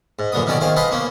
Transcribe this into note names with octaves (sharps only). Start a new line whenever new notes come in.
G#2
F#2 A#2 D3 B3 D#6
B2 D#3 F#3 C#4 A4 D5
D#3 G#4 C5 F5
A4 B4 D#5 F5 B5 C6
A#3 B3 C#4